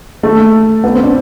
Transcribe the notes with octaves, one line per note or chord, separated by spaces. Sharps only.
A3
B3
C4
D4